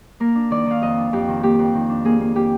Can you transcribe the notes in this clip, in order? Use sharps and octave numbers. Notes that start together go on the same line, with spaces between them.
A#3 A#4
D4
D#3 D5
D#3 F5
F2 D#5
D4
F2 G4
D#3
A#3 G4
F2
D#3
D4
A#3 G#4
A#3
A#3 G4